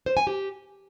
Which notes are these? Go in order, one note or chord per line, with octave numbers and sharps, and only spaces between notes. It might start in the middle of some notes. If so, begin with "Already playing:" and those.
C5
G#5
G4